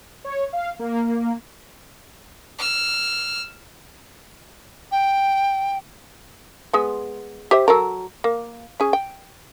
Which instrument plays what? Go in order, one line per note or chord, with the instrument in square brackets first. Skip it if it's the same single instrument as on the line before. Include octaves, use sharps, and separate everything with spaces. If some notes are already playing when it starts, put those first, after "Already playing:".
[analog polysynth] C#5
F5
A#3
[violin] E6 F6
[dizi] G5
[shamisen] G#3 B3
G4 C5 E5
F#3 A4 A#4
A#3
C#4 G#4
G5